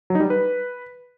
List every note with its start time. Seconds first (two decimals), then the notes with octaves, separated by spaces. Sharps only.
0.10 F#3
0.15 D#4
0.20 G3
0.25 D#4
0.30 B4